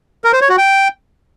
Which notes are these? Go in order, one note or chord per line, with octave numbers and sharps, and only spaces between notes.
A#4
C5
C#5
F#4
G5